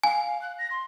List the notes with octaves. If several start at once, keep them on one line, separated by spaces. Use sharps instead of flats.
F5 G#5
F#6
A#6
C6